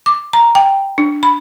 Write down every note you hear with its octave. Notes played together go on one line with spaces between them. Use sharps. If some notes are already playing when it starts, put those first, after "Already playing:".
D6
A#5
G5
D4
B5